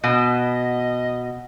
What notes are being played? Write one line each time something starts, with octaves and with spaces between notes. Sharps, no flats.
B2 D#5